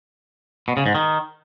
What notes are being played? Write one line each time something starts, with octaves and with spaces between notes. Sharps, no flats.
B2
C#3
G#2
D#3